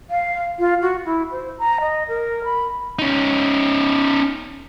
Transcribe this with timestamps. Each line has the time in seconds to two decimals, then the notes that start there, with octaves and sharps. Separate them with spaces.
0.10 F5
0.59 F4
0.82 F#4
1.06 E4
1.31 C5
1.59 A#5
1.81 D#5
2.08 A#4
2.44 B5
2.99 C#4 D#4